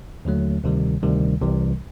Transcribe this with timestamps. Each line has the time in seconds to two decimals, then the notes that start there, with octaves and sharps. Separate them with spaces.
0.25 D#2 D3 F#3 A3
0.64 D2 C3 D#3 G3
1.03 D2 C3 D#3 G3
1.41 C2 C3 E3 G3